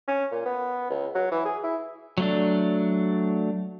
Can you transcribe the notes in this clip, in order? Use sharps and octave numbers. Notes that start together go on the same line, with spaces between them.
C#4
A#2
B3
C#2
F#3
E3
G#4
E4
F#3 A3 D4